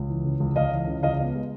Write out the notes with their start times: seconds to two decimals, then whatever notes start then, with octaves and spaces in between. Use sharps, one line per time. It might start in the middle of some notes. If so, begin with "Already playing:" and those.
Already playing: C#2
0.09 E3
0.25 C#3
0.40 C#2
0.56 C#2 D#5 F5
0.72 E3
0.87 C#3
1.03 C#2 D#5 F5
1.20 B3
1.36 G#3